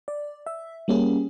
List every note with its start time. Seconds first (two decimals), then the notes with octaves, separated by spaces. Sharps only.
0.08 D5
0.47 E5
0.88 G3 A#3 C#4 G4 G#4